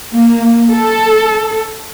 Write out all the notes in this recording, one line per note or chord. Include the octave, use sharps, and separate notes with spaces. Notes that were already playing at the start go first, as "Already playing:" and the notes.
A#3
A4